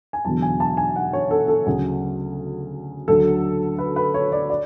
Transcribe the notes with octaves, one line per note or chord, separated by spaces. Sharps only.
G#5
E1 E2 D3 F#3 A5
G#5
A5
G#5
F#5
C#5
A4
A4
D2 C#3 F#3 G#4
D2 D3 F#3 A4
B4
B4
C#5
D5
D5